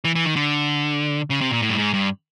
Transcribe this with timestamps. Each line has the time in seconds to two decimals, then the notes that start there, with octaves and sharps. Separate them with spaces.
0.04 E3
0.15 E3
0.25 D#3
0.36 D3
1.30 C#3
1.41 C3
1.51 A#2
1.62 A2
1.69 G2
1.78 G#2
1.94 G2